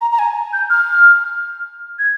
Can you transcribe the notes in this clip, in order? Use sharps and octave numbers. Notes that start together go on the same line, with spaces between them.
A#5
A#5
G#5
G6
F6
G#6